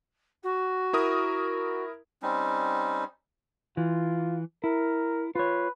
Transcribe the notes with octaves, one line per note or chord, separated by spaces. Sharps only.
F#4
E4 A#4 D#6
G3 C4 C#4 D#4
E3 F4
E4 A#4
F4 B4 C#5